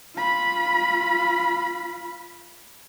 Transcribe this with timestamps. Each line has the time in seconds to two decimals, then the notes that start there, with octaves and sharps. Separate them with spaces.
0.16 F4 B5